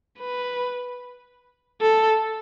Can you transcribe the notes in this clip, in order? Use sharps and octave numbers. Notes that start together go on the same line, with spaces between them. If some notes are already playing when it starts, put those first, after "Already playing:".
B4
A4